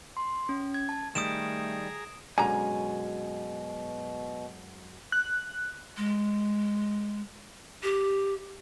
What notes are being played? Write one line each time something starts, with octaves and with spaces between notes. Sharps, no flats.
C6
C#4
G#6
A5
D#3 G3 A3 G#4 A#5 D#6 D7 E7
F#2 B2 D3 G#3 G#5 A#5
F#6
G#3
G4